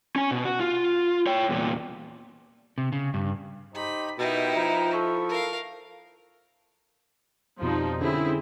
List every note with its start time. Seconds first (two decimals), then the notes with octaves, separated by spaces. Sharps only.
0.16 C#4 G#5
0.31 B2
0.45 F#4
0.60 F4
1.27 C#5 G5
1.49 E2 A#2
2.78 C3
2.92 C#3
3.14 G2
3.75 D#4 G4 C5 B5
4.19 B2 D#4 E4 G4 A#4 G5
4.56 F3 B4 G5 A#5
4.93 E4 A4 C#6
5.29 A#4 F5
7.62 F2 B2 F3 G3 D#4
8.01 D3 C4 C#4 E4 G#4